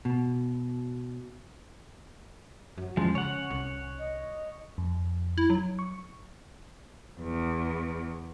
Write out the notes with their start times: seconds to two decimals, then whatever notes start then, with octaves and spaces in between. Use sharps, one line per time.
0.05 B2
2.78 F#2 F#3
2.97 E2 F3 G#3 C#4
3.15 C#3 C#5 F#5
3.50 C2
3.99 D#5
4.78 F2
5.38 E4
5.50 F#3
5.79 C#6
7.20 E2